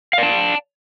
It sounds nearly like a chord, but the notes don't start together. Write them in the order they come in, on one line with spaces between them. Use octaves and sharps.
F5 D5 A5